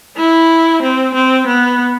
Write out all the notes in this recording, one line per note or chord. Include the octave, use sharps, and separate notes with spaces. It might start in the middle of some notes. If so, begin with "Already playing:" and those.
E4
C4
C4
B3